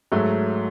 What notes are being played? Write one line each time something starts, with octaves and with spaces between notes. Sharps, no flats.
G#2 F#3 A3